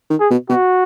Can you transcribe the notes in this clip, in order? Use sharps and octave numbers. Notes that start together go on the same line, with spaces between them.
D#3
G#4
B2
B2 F#4